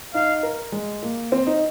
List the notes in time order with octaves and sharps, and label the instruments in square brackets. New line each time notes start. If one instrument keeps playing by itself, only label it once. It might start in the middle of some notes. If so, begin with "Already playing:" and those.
[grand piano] D#4 [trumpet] F5
[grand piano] A#4
G#3
A#3
C4
D#4